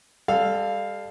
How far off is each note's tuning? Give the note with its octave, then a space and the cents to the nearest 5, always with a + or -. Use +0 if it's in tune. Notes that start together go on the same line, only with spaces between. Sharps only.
G3 +35 A4 +0 F5 +0